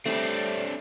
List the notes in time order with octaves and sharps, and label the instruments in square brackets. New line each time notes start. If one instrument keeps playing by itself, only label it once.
[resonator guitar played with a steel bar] G3 A3 [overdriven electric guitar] C4 D4